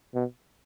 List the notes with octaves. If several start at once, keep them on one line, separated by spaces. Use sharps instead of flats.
B2